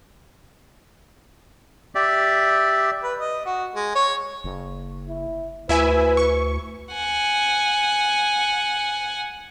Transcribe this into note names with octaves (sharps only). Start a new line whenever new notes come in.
G4 D5 E5
B4
D#5
F#4
G#3
C#5
F#1
E4
D2 E4 B4 E5 G#5
C#6
F#5 G#5